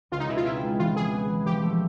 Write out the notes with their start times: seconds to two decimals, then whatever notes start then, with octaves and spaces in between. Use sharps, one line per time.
0.12 C#2 F4
0.20 D#4
0.28 B2 E4
0.37 F4
0.45 C4 E4
0.62 G#3
0.79 E3 F4
0.95 E3 G#4
1.12 B3
1.29 E3
1.46 F3 G4
1.63 A3